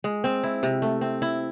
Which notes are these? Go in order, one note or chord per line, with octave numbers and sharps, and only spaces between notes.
G#3
C4
E4
C3
A3
C4
E4